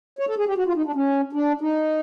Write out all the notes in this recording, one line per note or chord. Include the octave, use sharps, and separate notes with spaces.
C#5
A4
G#4
G4
F#4
F4
D#4
D4
C#4
D4
D#4